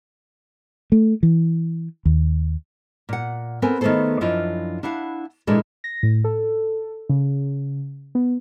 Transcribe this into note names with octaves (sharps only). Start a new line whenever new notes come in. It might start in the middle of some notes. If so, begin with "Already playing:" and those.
A3
E3
D#2
A#2 F#5
B3 C4 A4 A#4 G#5
D#3 A3 B3 G#4 A4 C5
F#2 F3 D4 E4 F4 D#5
D4 E4 F5 F#5
A#2 E3 G#3 D4 E4 A4
A#6
A2
A4
C#3
B3